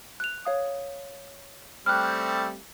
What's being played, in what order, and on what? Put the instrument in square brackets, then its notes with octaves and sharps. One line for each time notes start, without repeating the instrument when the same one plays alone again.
[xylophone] F#6 F7
C#5 F5 D#6
[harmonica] G3 A3 C4 [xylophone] F6 F#6